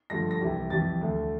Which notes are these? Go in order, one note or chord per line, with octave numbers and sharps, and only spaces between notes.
G2 D3 F3 A3 A#6
A#6
C2 C3 E3 G3
F2 E3 G3 A6
D2 D3 A3